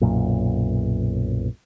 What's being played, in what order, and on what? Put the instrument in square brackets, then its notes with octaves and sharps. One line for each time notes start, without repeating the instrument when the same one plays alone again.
[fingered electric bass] B1 F#2 A#2